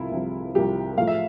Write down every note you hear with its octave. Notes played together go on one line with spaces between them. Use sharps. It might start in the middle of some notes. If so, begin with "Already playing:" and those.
Already playing: C2 C3 F3 E4 F4
C2 C3 F3
C2 C3 F3 G4
A2 F3 A3 F5
E5